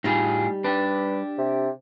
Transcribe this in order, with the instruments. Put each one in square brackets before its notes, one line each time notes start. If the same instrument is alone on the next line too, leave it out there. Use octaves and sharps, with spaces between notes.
[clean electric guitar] A2 F4 G#4 [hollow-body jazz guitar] G3 D#4
[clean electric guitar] D4 G4 [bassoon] B4
[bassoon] C3